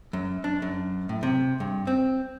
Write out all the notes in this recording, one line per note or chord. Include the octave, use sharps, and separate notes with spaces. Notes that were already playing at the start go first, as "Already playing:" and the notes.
F#2
D4
F#2
A2
C3
G2
C4